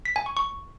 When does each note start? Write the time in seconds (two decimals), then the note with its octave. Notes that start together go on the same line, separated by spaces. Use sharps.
0.05 B6
0.16 G#5
0.26 C#6
0.37 C#6